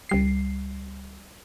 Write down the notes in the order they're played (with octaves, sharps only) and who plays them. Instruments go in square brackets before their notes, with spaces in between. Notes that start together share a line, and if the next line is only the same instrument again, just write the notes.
[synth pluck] C#2 G3 C7